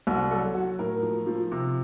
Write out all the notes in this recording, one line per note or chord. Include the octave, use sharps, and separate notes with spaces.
C2 F#4
F#3 A4
F#3 F#4
A2 A#4
F3
F3
C3